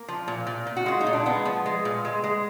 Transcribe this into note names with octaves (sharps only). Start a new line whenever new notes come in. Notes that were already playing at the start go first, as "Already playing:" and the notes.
Already playing: A#3
F3
A#2
A#2
A#2
F#4
G#3 F4
D#4
A#2
D4
G#3 B3
F3
G#3
A#2
G#3
G#3